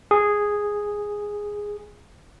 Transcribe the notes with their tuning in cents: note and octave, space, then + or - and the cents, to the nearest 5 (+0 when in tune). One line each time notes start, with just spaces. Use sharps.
G#4 -5